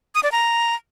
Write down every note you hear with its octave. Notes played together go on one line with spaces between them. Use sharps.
D#6
D5
A#5